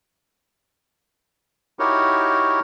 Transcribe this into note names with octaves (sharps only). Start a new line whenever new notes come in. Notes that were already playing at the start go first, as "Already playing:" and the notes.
D#4 E4 F#4 G4 A#4 C#5